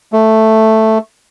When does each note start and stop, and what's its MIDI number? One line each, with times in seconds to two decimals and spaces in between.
0.13 0.98 57